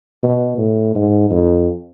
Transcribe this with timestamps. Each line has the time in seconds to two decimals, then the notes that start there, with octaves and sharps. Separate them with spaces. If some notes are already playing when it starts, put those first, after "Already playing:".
0.23 B2
0.58 A2
0.95 G#2
1.30 F2